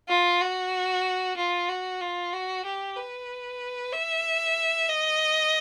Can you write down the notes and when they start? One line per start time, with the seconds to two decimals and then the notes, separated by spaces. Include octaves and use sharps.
0.09 F4
0.41 F#4
1.37 F4
1.69 F#4
2.01 F4
2.33 F#4
2.65 G4
2.96 B4
3.93 E5
4.89 D#5